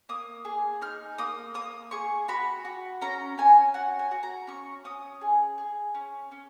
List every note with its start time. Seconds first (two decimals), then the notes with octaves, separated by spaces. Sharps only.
0.09 A#3 D#6
0.45 G#4
0.82 D#4 F6
1.18 A#3 D#6
1.54 A#3 D#6
1.91 G#4 C#6
2.28 F#4 B5
2.65 F#4
3.01 C#4 A#5
3.38 C#4 G#5
3.74 F#4 F#5
3.99 G#5
4.11 F#4
4.23 A#5
4.47 C#4 C#6
4.85 C#4 D#6
5.21 G#4
5.58 G#4
5.95 C#4
6.31 C#4